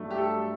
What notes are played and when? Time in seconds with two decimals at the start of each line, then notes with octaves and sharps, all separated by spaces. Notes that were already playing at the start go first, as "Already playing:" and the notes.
Already playing: G2 F#3 A3
0.11 G4
0.17 A4